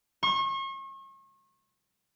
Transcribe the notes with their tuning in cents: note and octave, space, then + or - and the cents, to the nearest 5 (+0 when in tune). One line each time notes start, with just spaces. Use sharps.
C#6 -40